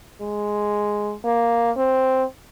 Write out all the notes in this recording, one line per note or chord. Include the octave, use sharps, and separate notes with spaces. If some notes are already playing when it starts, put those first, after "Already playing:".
G#3
A#3
C4